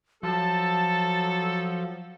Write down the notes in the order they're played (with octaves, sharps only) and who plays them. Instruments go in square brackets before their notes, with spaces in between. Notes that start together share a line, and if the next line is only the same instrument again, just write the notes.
[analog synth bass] F3 [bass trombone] F#3 [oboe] A4 [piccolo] A5